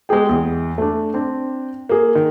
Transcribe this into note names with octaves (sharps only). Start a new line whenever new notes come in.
G#3 B3 G4 G#4 G5
E2 E3
A3 D4
C4 D4
A#3 G#4
D#3